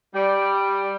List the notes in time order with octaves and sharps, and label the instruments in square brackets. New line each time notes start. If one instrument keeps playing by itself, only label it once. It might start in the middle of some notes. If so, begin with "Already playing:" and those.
[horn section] G3